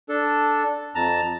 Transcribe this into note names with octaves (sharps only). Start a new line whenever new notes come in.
D4 A4
F2 A5 A#5